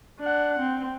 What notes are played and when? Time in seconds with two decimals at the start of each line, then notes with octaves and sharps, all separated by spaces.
0.19 D4 F#5
0.59 C4